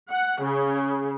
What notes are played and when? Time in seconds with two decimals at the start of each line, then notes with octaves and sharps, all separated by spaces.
0.11 F#5
0.44 C#3